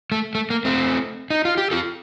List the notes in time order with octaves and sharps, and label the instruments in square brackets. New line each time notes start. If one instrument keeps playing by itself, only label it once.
[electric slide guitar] A3
A3
A#3
A3 C4
D#4
F4
G4
F4 A4